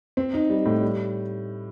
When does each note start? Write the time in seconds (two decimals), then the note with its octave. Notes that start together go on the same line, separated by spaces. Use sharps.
0.17 C4
0.34 D#4
0.50 G3
0.66 A2
0.82 G3